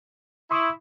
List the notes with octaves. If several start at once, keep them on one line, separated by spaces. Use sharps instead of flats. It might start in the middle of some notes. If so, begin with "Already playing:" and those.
E4 C6 C#6 D#6